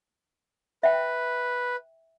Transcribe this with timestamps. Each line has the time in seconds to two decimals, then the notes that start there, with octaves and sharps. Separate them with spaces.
0.83 B4 E5 G5